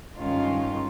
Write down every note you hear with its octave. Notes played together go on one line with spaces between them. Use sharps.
G2 D#3 G#3 C#4 F4